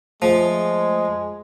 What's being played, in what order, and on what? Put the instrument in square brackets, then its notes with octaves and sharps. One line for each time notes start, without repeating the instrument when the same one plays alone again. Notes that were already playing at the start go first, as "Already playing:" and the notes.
[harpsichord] F3 [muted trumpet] G#3 [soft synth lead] A3